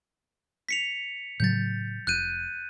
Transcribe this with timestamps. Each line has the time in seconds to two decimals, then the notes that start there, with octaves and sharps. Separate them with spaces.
0.69 B6 C#7 F7
1.40 A2 C#3 F#3 G6 A6
2.07 F1 F#6 G6 D#7